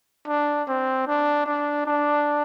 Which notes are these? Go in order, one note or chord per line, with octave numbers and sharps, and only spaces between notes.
D4
C4
D4
D4
D4